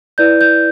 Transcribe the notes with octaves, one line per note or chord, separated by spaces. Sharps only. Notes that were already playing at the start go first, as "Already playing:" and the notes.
E4 B4 D5 G6
G6